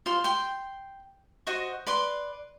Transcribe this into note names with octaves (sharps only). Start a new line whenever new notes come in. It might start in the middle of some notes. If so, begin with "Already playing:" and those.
F4 C5 C6
G5 C6
F#4 C5 D#5 C#6
B4 D5 C6